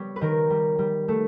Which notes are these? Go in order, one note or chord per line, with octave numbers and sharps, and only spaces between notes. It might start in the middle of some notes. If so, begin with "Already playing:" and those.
Already playing: G3 B3 C#5
B4
D#3 A#4
G3
G3
A3